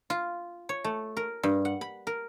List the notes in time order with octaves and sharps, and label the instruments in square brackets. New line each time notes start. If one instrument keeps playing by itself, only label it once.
[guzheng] F4
C#5
A3
A#4
G2
F#5
B5
A#4